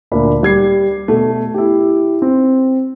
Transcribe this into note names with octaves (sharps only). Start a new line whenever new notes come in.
D2 A#2 D4 A#4 B5
G3 G#6 C7
B2 A3
E4 G4
C4